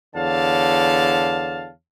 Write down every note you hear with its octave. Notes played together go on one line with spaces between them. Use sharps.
E2 D3 C#5 F5 A5